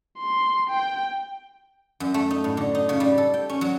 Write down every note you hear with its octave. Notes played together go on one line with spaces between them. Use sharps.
C6
G5
F#2
A3
D#4
A2
D3
D#4
C#3
G3
A4
G5
C#4
F#3